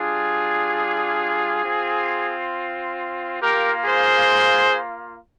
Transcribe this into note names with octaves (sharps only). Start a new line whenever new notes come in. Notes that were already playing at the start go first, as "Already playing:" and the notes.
Already playing: G3 D4 F4 G#4
C4 F4
A#3 F4 G4 A#4
G#4 C5